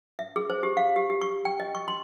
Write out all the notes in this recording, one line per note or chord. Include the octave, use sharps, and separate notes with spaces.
E5
G#4
C5
G4
F5
G4
G4
C#6
G5
D#5
C#6
C6